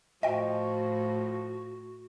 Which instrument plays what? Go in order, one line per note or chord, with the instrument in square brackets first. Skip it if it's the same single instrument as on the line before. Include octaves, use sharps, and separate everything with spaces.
[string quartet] A2 [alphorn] F3 [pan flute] F#4 [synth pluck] D#5 G5